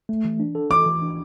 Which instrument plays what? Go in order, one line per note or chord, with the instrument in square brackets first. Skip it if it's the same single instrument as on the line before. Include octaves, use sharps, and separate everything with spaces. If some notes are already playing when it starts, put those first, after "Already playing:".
[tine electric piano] A3
E3
D4
A4
[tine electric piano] E3 [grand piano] D6
[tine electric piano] E3
D4